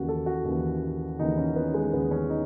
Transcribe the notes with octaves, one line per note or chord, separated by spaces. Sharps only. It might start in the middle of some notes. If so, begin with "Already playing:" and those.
Already playing: D#2 C#3 E3 F#4
A4
F#4
D#2 C#3 E3
D#2 C#3 E3 D#4
C#4
B3
G#3
D#2 C#3 E3 B3
C#4
D#4